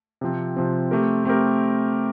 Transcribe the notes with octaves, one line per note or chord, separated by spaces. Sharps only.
C3 F3 C4
C3 F3 C4
A3 C4 G4 A#4
A3 C4 G4 A#4